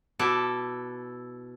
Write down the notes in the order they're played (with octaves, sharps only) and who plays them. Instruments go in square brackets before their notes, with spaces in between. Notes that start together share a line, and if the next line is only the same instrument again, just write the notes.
[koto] B2 E4 A4 D5 A5